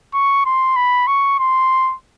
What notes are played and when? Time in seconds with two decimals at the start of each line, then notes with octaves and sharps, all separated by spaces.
0.14 C#6
0.46 C6
0.76 B5
1.07 C#6
1.39 C6